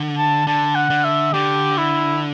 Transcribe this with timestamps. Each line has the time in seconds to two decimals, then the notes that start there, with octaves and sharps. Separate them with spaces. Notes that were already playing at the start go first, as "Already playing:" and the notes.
Already playing: D3
0.18 A5
0.47 D3 A5
0.75 F#5
0.90 D3
1.04 E5
1.33 D3 G4
1.77 E4